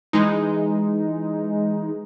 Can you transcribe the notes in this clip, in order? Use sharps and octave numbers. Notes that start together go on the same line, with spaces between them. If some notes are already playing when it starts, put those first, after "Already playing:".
E3 G#3 D#4